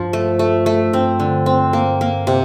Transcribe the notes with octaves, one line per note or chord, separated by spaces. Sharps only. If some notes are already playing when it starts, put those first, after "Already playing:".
Already playing: G2 F3
A3
A3
A3
G2 C4
D3
C4
A#3
A#3
C3